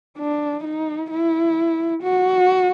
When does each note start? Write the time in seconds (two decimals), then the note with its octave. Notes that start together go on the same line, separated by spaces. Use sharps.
0.18 D4
0.64 D#4
1.10 E4
2.02 F#4